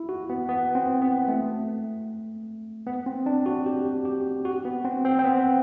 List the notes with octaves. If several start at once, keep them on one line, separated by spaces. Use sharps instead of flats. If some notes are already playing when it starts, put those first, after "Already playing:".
Already playing: E4
F#4
B3
B3
C4
B3
A3
B3
C4
D4
F#4
G4
G4
F#4
B3
C4
C4
C4
B3